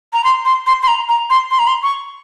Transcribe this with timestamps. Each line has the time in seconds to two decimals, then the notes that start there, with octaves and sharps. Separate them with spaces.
0.13 A#5
0.24 C6
0.45 C6
0.67 C6
0.83 C6
0.88 A#5
1.09 A#5
1.30 C6
1.51 C6
1.59 A#5
1.67 C6
1.83 C#6